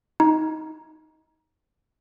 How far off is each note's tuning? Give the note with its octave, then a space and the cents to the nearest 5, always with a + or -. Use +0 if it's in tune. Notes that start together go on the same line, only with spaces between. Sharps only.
D#4 +15